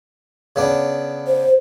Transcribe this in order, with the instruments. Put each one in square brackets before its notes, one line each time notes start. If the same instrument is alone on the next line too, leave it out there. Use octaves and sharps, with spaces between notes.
[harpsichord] C#3 B3 D4
[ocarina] C5